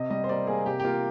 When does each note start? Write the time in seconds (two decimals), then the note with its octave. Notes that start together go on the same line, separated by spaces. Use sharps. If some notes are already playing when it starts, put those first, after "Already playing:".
Already playing: C3 D#5
0.10 G3 D#5
0.24 C5
0.29 A#3 D5
0.47 A#3 G#4
0.65 C3 G4
0.80 G4
0.84 A#3 F4